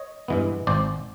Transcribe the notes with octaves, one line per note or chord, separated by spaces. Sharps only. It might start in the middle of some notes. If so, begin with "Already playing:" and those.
Already playing: C#5 D#5
G2 E3 G#3 B3
G#1 C5 D5